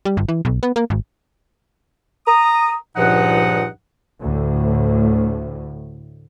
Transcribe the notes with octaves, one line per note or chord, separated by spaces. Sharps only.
G3
G1
E3
B1
B3
A#3
G#1
A#5 D#6
C#2 G2 A#2 F3 D#4 F#5
D2 A2